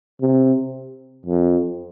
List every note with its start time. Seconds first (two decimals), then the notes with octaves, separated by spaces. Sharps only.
0.21 C3
1.26 F2